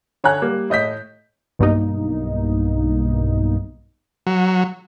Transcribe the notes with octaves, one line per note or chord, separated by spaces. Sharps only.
D3 C#5 F#5 G#5 A#5 F#6
G3 A#3
A2 D#5 G6 B6
B1 G2 B2 A#3 D#4
F#3